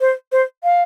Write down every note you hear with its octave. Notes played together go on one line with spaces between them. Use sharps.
C5
C5
F5